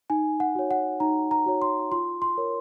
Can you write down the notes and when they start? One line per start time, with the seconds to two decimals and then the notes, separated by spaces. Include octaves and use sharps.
0.10 D#4 G#5
0.40 F#5
0.55 F#4 C#5
0.71 F#5
1.00 D#4 A#5
1.31 A#5
1.46 F#4 C#5
1.62 C6
1.92 F4 C6
2.22 C6
2.38 A#4 C#5